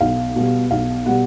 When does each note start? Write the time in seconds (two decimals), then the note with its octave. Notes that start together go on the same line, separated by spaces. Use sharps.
0.01 B1 F5
0.36 B2 G3
0.71 B1 F5
1.06 B2 G3 F#5